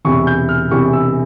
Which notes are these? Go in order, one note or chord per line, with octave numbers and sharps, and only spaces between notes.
E1 E2 C3 E3 C#6
G6
F6
E1 E2 C3 E3 C#6
E6